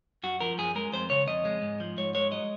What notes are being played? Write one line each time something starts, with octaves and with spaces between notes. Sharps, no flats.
F#2 F#4
F3 A#4
F#2 G#4
G#3 A#4
F2 C5
C#3 C#5
F2 D#5
G#3
G#2
F3
G#2 C#5
G#3 C#5
F#3 D#5